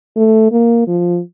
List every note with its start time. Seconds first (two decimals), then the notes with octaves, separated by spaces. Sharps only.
0.16 A3
0.52 A#3
0.88 F3